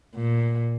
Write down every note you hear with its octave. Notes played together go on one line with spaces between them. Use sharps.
A#2